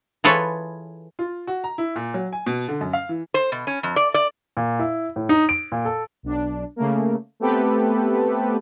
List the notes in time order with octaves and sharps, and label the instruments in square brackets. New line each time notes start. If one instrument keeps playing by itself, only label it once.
[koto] E3 F4 G#4 A4 B4 C#5
[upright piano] F4
F#4
A#5
E4
A#2
F#3
G#5
B2
D3
F#2
F5
E3
[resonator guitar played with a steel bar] C5
B2
C#4
F2
D5
D5
[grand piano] A#2
E4
A2
D#4
D7
A#2
A4
[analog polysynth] B1 D4
C#3 A3 A#3
A3 B3 C4 G4 A4 B4